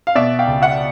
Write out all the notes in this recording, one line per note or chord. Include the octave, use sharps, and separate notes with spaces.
F5
B2 D5 E5
F5 G5
C#2
E5 F#5